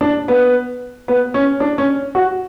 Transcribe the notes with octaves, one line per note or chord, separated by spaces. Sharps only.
D4
B3
B3
C#4
D4
C#4
F#4